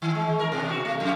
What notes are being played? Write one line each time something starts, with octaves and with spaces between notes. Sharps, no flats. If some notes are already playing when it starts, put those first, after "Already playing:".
D#3
G#3
A#4
B2
F#4
A3
F2